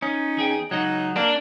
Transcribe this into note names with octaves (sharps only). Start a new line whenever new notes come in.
C#4 D#4
E2 G#4 G5
C#2 F#3 D#4 D#5 F#5
A#3 D4